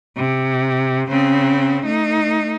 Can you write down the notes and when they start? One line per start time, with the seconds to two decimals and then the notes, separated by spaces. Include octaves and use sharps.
0.17 C3
1.08 C#3 C4
1.85 A3 D#4